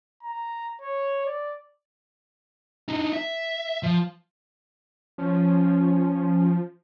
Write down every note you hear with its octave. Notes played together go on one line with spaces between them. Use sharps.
A#5
C#5
D5
D4 D#4
E5
F3
F3 C#4